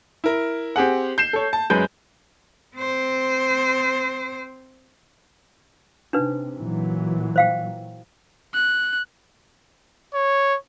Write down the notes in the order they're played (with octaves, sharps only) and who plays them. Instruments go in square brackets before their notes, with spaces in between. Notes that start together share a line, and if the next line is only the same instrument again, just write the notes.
[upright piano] E4 A#4
C4 G4 G#4 F#5
G6 C7 E7
A4 C#5
A5
F#2 G#3 B4 G6
[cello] C4 C5
[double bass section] C3 [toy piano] D4 D#4 B4
[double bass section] A#2 E3 F#3
[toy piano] C5 F5 G5
[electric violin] F#6
[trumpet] C#5